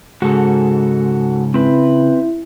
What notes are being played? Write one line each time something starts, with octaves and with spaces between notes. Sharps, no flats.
G#2 C#3 F#4 A4
C4 E4 B4